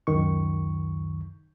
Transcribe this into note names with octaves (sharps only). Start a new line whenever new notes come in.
C#2 F#2 D#3 C#6